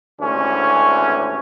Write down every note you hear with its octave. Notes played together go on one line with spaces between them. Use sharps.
G#1 D2 C3 E3 C#4